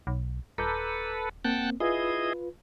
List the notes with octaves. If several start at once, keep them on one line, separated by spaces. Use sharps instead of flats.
B1
D#1 A4 B4 A#5 D6 G6
A#3 C4 F#5 G5 A5
E4 F4 G#4 B4 D#5